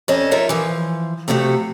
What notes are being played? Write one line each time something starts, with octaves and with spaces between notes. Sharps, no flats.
F2 C#4 C#5 D#5 A5
D#4 F4 A#4 C#5 E5
E3 F3
C3 F3 A3 F#4 G4